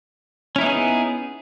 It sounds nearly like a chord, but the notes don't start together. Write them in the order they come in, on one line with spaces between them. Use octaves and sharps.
C#4 E4 D#4 B3 G#4